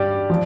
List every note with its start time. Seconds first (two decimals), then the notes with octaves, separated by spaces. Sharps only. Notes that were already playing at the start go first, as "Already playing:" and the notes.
Already playing: G2 G4 D5
0.30 F3